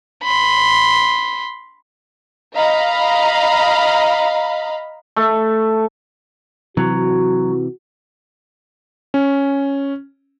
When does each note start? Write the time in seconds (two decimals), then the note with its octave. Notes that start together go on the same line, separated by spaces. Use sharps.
0.23 B5 C6
2.54 D#5 F5 A#5 B5
5.16 A3
6.77 C3 E3 F#3 F#4
9.14 C#4